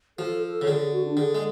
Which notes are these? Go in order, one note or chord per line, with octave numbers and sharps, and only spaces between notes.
F3 A4
A4
C#3
D3 G#4
G#4
F#4
D4
D3 G#4
G#3